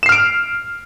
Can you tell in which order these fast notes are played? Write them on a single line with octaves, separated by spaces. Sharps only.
E7 C7 F6 D7